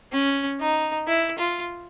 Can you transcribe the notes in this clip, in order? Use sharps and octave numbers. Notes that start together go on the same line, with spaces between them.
C#4
D#4
E4
F4